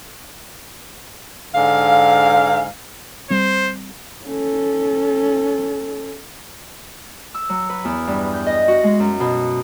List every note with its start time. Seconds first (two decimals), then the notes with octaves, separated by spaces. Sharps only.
1.55 G#2 D3 F5
3.30 G3 C4 C5
4.25 C#4 A4
7.34 E6
7.49 F#3
7.70 B4
7.85 E2
8.07 G2
8.34 G6
8.46 D#5
8.68 F#4
8.84 G#3
9.00 F#2
9.20 B2